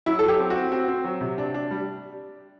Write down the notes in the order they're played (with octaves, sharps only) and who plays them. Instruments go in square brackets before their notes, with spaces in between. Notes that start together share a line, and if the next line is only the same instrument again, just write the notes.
[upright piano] F#3 [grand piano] E4
[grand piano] A4
[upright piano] F#3
[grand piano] G4
[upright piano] C4
[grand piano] F#4
[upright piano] C4
C4
C4
F#3
C3
D4
D4
G3